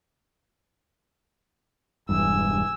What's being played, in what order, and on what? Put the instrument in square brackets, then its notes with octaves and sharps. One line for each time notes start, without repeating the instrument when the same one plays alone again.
[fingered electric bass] E1 E2 G2 [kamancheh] G#5 E6